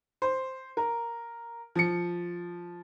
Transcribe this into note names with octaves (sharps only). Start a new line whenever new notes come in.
C5
A#4
F3 C#7